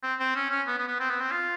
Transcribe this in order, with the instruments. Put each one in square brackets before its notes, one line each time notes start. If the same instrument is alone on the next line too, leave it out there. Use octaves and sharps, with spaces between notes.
[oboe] C4
C4
C#4
C#4
B3
B3
B3
C4
B3
C4
F4